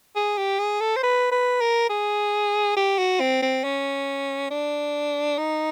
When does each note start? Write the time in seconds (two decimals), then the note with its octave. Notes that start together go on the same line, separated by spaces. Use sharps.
0.16 G#4
0.38 G4
0.59 G#4
0.80 A4
0.96 C5
1.03 B4
1.32 B4
1.61 A#4
1.89 G#4
2.77 G4
2.98 F#4
3.20 C4
3.42 C4
3.64 C#4
4.51 D4
5.38 D#4